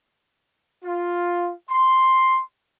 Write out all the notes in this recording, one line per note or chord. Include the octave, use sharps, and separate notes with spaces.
F4
C6